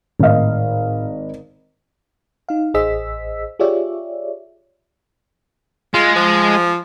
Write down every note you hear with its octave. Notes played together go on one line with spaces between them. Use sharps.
G#1 A2 D#5 F5
D#4 F5
A1 G#4 C5 D#5 E6 B6
F4 G4 G#4 C#5 D5 E5
G#3 F4
F3